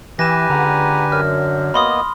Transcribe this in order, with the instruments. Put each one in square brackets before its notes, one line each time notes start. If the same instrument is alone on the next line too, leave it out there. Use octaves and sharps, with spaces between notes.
[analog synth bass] E3 [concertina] G4 B4 G#5 [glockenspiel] A#6 E7
[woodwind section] C#2 F#5 A#5 [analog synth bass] D3
[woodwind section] F#2 [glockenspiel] F6
[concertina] A#3 B3 D#5 [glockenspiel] B5 C6 D#6